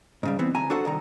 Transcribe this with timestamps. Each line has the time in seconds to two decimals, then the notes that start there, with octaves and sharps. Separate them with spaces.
0.23 G#2 C#3 G3
0.39 E3 B3 C4
0.54 D2 G#5 A#5
0.70 D4 F#4 A4 C5 F#5
0.85 C2 D#3 A#5